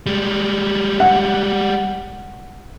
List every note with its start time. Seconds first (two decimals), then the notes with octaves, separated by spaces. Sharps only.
0.06 G3 G#3
1.00 F#5